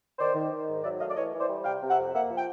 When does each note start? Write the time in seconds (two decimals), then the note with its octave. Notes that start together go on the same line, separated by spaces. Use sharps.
0.19 D#3 C5 D5
0.35 D#3
0.52 D#3
0.68 G#2
0.84 F#3 D5 E5
1.00 A3 D#5 F5
1.10 D5
1.16 E3 C#5 D#5
1.33 E3
1.40 C5 D5
1.49 G3
1.65 C3 F5 G5
1.82 C3
1.90 E5 F#5
1.98 F2
2.13 A#3 E5 F#5
2.31 F3
2.38 G5